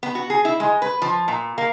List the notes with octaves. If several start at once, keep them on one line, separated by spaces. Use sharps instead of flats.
B3
F#4
G#4
E4
G#3
B4
F3
A#2
A#3